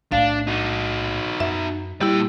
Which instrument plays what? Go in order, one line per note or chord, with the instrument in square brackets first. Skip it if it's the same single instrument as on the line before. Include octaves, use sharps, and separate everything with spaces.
[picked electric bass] B1 A2 A3 [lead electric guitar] D4 [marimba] F5
[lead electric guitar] D#4 F#4
[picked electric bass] F#2 [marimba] E5
[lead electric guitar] A#2 G5 [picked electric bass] G3 [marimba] E4 G4